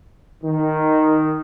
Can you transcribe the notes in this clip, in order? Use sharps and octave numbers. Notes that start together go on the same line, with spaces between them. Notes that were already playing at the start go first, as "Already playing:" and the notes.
D#3